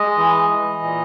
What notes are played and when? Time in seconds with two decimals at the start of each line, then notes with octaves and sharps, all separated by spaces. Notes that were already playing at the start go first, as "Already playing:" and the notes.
Already playing: G#3 D#5
0.17 E3
0.50 E3
0.83 A#2